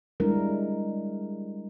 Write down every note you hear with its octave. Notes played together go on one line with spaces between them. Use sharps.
G3 G#3 D4 E4 A#4